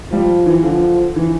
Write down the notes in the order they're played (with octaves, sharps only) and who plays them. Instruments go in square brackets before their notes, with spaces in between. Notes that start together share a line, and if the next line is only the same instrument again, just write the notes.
[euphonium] F3 [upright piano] G3
[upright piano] E3
[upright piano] D3 [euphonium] F3
[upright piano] E3